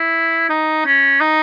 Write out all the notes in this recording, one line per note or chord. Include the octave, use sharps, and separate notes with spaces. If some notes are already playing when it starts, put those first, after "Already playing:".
Already playing: E4
D#4
C#4
D#4